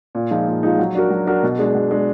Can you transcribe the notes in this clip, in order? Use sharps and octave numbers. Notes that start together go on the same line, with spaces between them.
A#2
F3 G#3 D#4
A#2
F3 G#3 D#4
F#3
D4 F#4 A#4
F#3
D4 F#4 A#4
B2
G#3 D4
B2
G#3 D4